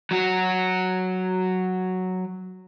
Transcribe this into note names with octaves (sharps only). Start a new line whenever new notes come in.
F#3 F#4